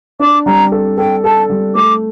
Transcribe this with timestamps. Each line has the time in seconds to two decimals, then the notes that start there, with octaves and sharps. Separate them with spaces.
0.20 D4 D6
0.46 G3 A#5
0.72 A4
0.98 A4 G5
1.24 A4 A5
1.50 G3
1.75 A3 D6